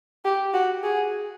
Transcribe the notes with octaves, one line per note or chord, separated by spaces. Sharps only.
G4
F#4
G#4